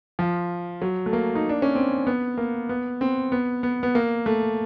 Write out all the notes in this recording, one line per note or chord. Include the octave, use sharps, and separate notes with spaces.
F3
F#3
A3
A#3
D#4
D4
C#4
C4
B3
A#3
B3
C4
B3
B3
B3
A#3
A3